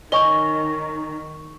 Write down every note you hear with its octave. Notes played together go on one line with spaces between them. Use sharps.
D#3 C#4 D#5 C#6 G7